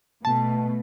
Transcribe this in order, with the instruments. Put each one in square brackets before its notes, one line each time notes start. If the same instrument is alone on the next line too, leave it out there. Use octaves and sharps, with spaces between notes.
[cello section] B2 A3 [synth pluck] A5